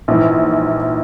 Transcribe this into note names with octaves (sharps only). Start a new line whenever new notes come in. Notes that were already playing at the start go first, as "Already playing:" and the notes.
A#1 G#2 E3